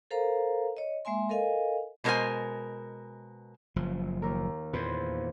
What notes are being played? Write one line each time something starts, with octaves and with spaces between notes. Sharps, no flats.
A4 A#4 C5 F5 A#5
C#5 D#5
G#3 A#3 E5 G#5 C6
A4 A#4 D#5 F5 G#5
B2 G#3 G#4 A#4 C5 G#5
F#1 F3
D#2 A#4
E2 A#2 B4 C5